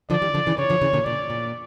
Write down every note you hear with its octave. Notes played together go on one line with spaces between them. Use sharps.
D3 F3 D5
E3 G3
D3 F3
C#3 E3
C#3 C#5
D3 F3
C#3 E3
A#2 D3
A#2 D5
A#2